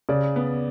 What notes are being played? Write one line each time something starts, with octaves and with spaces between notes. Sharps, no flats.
C#3 D5
B3